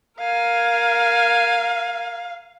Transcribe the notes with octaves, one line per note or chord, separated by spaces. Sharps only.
A#4 F5 G#5